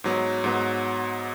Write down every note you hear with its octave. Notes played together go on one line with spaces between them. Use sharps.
G#2 F#3 B3
G#2 F#3 B3